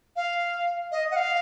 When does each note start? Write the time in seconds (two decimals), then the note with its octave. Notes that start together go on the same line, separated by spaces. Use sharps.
0.16 F5
0.92 D#5
1.11 F#5
1.16 F5